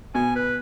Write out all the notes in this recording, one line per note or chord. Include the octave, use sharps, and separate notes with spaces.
B2 G#5
B4